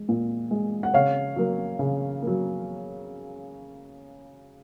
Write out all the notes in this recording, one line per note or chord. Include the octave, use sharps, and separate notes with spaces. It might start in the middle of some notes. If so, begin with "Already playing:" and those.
Already playing: G#3
A#2
G#3
F#5
C#3 C#5 F5
F#3 A#3
C#3
F#3 A#3